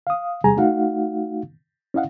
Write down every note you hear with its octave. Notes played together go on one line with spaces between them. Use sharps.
F5 D#6
E2 C3 G3 G#4 G#5 A#5
A3 D#4 F#4 F5 F#5
C#4 E4 D#5 F5 F#5